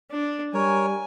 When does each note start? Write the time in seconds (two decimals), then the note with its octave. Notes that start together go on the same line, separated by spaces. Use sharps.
0.11 D4
0.54 G3 A#4 C#5 G#5